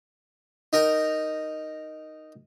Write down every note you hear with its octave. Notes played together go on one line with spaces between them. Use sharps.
D#4 A#4 G5 A#5